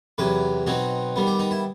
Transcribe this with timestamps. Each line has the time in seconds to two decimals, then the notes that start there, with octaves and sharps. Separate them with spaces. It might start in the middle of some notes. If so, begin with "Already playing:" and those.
0.18 E2 C3 F#3 B4
0.67 B2 F#3 C4 D#4
1.16 D#3 G3 B3
1.27 G4
1.39 D#4
1.51 E4